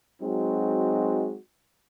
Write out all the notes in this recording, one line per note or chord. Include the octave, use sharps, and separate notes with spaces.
F#3 G#3 C4 D#4 F#4